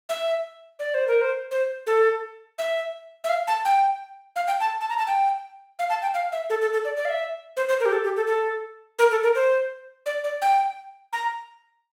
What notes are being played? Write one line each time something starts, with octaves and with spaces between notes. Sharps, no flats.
E5
D5
C5
A#4
C5
C5
A4
E5
E5
F5
A5
G5
F5
G5
A5
A5
A#5
A5
G5
F5
A5
G5
F5
E5
A4
A4
A4
D5
D5
F5
E5
C5
C5
A#4
G4
A4
G4
A4
A4
A#4
A4
A#4
C5
D5
D5
G5
A#5